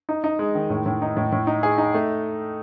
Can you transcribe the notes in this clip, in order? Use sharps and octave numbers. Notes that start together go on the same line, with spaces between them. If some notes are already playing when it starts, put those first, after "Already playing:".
D#4
D#4
G#3
D#3
A2
A2
D#4
A2
A2
D#4
G#4
D#4
A3